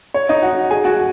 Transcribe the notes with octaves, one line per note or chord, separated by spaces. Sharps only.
C#5
D#4 D#5
F#4 F#5
G#4 G#5
F#4 F#5